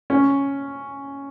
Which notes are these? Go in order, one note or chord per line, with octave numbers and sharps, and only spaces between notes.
C#4